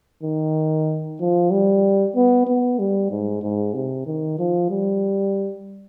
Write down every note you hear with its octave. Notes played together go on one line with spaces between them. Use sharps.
D#3
F3
G3
B3
B3
G3
G#2
G#2
C3
D#3
F3
G3